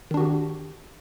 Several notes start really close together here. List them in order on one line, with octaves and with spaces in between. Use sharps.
D#3 D4 F#4 G4